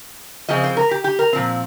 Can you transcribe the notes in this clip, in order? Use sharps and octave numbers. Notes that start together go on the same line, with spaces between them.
C#3 F3 G#3 C4 D#5
C5
A#4
G4
G4
A#4
A#2 F3 C4